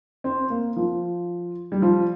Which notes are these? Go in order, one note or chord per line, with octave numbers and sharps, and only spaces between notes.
C4
A#3
F3
G3
F3